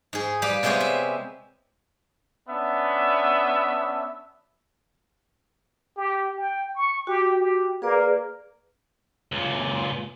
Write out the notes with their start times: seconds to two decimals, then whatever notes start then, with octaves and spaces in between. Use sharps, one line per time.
0.13 G#2 G#4
0.42 G3 G4 B4 F5 B5
0.63 C3 G#3 B3 G4 C5 C#5
0.81 E5
2.48 B3 C#4 D4 E5
5.97 G4
6.38 G5
6.76 C#6
7.07 F#4 G4
7.40 G4
7.82 A#3 G#4 B4 D5
9.32 C#2 A#2